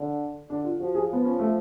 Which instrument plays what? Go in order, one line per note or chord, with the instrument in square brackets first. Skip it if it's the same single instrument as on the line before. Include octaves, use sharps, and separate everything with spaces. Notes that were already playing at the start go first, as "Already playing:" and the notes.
Already playing: [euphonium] D3
[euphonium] D3 [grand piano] D4
[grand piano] F4
[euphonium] F3 [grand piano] F#4
[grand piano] G#4
[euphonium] F3 [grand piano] B3
[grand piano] C#4
A3